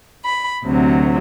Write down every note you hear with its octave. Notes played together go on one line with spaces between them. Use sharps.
B5
D2 C3 F#3